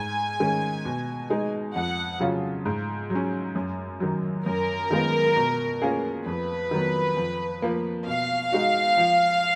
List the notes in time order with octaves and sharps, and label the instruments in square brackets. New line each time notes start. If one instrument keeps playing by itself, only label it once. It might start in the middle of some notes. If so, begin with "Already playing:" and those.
Already playing: [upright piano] G#2 [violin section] G#5
[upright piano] D#3 G#3 C#4
B2
G#3 D#4 G#4
[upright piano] F2 [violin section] F#5
[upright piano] C#3 F#3 C#4 F4
G#2
F#3
C#4
F#2
D#3 F#3
[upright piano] F#2 [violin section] A#4
[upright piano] D#3 G#3 B3 F4
B2
A#3 C#4 F4 G#4
[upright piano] F2 [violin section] B4
[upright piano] D#3 F#3 B3
F2
F3 A#3
[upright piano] B2 [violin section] F5
[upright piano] G#3 D#4 F#4
F3